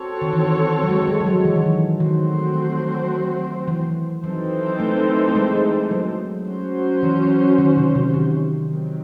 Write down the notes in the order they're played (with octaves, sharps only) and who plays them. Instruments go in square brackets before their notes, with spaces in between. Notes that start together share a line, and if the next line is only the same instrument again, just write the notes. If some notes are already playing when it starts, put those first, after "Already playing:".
Already playing: [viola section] C4 F#4 A4 C#5
[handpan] D#3
E3
F#3
G#3
G#3
G#3
F#3
E3
D#3
E3
[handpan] D#3 [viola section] F#3 A3 C4 F#4 C5
[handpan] E3
[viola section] E3 C4 D#4 A4 C5 [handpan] F#3
[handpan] A3
A3
G#3
F#3
[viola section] F#3 C#4 F#4 C5
[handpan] E3
D#3
C3
C3
D#3
[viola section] D#3 F#3 C4